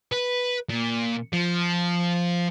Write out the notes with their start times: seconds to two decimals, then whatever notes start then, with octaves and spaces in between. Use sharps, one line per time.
0.12 B4
0.69 A#2
1.33 F3